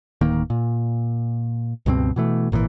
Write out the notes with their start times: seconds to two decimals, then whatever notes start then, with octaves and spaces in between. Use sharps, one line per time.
0.21 D1 D#3 A#3
0.50 A#2
1.86 C#2 G2 B2 C4
2.16 B2 E3 A3
2.52 G#1 A#2 D#3 E3